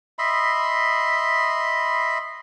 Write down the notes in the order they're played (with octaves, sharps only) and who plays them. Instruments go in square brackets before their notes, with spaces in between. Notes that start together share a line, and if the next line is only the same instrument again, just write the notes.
[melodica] D#5 E5 B5 C6